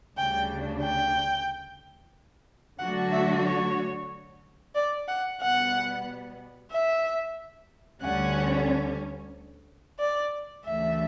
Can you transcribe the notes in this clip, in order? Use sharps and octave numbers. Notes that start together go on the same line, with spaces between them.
D2 C#3 G3 D4 G5
G5
D3 F#3 A3 D4 F#4 F#5
E5
C#5
D5
F#5
B2 G3 B3 F#5
E5
D2 D3 G3 C#4 F#5
D5
D2 C#3 E3 A3 D4 E5